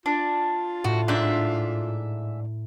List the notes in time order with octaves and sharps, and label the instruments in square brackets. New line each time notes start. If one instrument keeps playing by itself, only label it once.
[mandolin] D4 [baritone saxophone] F4
[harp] A2 [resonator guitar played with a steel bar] F#4
[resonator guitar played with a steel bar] G#2 D4 [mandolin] G#4 E5